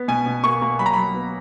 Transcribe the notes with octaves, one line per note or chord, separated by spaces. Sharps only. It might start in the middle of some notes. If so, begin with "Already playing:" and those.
Already playing: B3
B2 G#5
B2
A#3 C#6
A#3
F#3 B5
A#5
F#3 B5
B3